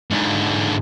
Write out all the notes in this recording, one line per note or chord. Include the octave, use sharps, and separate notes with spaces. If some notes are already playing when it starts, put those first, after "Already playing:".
G#2 D3